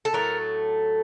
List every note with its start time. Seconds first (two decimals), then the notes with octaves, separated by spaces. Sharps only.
0.05 A4
0.13 A2 F#3 A3 A#4